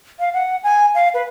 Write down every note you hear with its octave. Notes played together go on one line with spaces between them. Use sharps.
F5
F#5
G#5
F5
B4